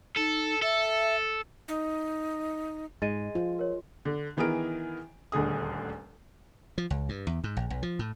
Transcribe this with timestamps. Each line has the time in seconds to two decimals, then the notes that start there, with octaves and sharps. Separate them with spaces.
0.17 D#4 A4
0.62 A4 E5
1.68 D#4
3.02 G#2 G#3 A6 D#7
3.35 F3 F4
3.59 A#4 C#5
4.05 D3
4.37 D#3 E3 B3 G#4 A#4 D7
5.32 D#1 D2 D3 G#4 D#6
6.78 F3
6.90 C#2
7.09 G2
7.27 E2
7.44 G#2
7.57 A#1
7.70 B1
7.83 F3
7.99 A2